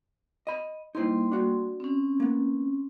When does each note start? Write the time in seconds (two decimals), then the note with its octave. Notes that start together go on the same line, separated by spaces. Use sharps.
0.47 D#5 B5
0.95 G3 A#3 D#4 E4 C5 C6
1.32 D4 F#4
1.80 C4 C#4
2.20 A#3 B3